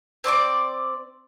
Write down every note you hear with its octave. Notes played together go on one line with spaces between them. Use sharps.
C4 D5 C6 D6